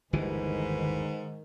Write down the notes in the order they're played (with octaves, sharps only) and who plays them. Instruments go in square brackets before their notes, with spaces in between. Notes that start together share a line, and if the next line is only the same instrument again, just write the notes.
[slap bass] G1 D#2 E3 [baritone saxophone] G#2 [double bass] D#3 [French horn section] B4